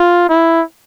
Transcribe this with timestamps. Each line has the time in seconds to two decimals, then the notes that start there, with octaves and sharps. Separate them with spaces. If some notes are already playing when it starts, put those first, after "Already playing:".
Already playing: F4
0.29 E4